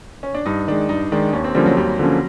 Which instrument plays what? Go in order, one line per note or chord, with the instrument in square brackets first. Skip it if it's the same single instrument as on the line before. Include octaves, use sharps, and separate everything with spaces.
[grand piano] C#4
D4
[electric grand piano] G2 [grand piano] D#4
[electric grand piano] D#3 G#3 [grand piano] D4
[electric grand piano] G2 [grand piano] D#4
[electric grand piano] D#3 G#3 [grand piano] D4
[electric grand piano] D#2 [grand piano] C#4
[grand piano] C4
[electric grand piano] D3 F3 A#3 C#4 [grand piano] G3
[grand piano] F#3
[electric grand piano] D#2 [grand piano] G3
[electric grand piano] D3 F3 A#3 C#4